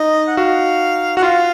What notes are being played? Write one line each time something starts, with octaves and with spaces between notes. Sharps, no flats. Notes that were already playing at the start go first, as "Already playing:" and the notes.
Already playing: D#4 D#5
F#5
F#4 F5
F#4 F#5
F4 F5